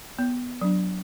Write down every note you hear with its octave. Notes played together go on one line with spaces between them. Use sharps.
B3
F#3 D4